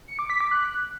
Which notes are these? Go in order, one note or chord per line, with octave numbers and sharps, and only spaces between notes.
C#7
D6
B6
D6
F#6